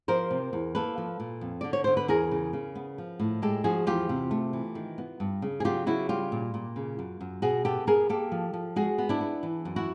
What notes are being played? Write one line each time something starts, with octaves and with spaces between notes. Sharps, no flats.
F3 A#4 C5
C3
E2
A#3 A4 B4
F3
A#2
F2
D3 D5
C#5
D3 C5
B4
E2 G#4 A#4
C#3
C#3
B3
F3
A2
G#3 G4 A4
F3 F#4 G#4
E2 F4 G4
C3
A3
E3
D#3
B3
G2
C#3
G#4
F#3 F4 G4
C#3 E4 F#4
G3 F4 G4
A#2
A#2
C#3
F#2
F#2
B2 F#4 G#4
B3 G4 A4
B3 G#4 A#4
A#3 G4 A4
F3
F3
G#3 F#4 G#4
B3
D4 E4
B3
E3
F#2
E4 F#4